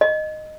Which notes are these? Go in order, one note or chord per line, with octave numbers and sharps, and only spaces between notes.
D#5